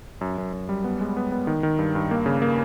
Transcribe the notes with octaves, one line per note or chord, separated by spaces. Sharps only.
F#2
F#2
F#2
G3
B3
G#3
B3
B3
D#3
D#3
G2
G2
A#3
C#3
A#3